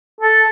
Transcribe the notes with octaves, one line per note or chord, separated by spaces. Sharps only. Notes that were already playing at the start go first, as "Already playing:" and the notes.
A4